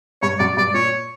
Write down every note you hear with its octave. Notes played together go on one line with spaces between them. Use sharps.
G2 C#5
F#2 D5
G2 D5
A#2 C#5